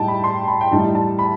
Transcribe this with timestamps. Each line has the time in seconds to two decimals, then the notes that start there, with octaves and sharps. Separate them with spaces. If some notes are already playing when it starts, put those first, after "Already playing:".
Already playing: A2 G3 D#4 G5 A5
0.08 B5
0.24 C6
0.48 B5
0.61 G5
0.71 A2 E3 G3 D#4 A5
0.95 A5
1.19 B5